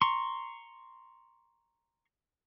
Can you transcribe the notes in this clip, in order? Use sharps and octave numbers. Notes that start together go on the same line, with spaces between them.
A#5 C6 C#6